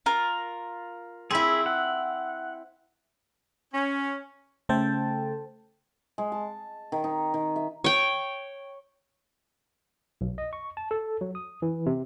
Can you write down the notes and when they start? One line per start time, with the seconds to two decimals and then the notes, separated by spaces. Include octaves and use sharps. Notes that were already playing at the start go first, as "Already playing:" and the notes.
0.06 F4 A#4
1.31 C4 E4 G#4 B5
1.66 F#5
3.73 C#4
4.69 C#3 A3 A4 C5 G5 A5
6.18 G#3
6.32 A5
6.92 D#3
7.04 D#4
7.34 D#3
7.56 E5
7.84 C#5 G5
10.21 B1
10.38 D#5
10.53 C#6
10.77 A5
10.91 A4
11.21 F#3
11.35 D#6
11.62 E3
11.86 C3